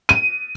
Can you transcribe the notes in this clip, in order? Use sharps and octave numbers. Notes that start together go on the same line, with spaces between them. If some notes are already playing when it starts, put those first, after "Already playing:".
D#7